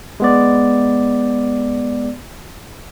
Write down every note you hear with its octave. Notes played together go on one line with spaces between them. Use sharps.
G#3 B3 D5